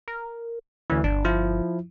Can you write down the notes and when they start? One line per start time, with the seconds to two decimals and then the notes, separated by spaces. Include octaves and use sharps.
0.08 A#4
0.90 D2 E3 C#4
1.04 G1 D4
1.25 F3 E4